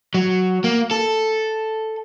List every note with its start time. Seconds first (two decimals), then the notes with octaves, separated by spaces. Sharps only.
0.14 F#3
0.64 A#3
0.91 A4